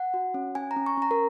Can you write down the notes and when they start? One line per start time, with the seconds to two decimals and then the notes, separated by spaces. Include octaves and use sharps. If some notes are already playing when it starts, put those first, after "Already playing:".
Already playing: F#5
0.14 F#4
0.34 C#4
0.55 C#4 G#5
0.71 A#5
0.76 C#4
0.86 C#6
0.97 C#4 A#5
1.11 A#4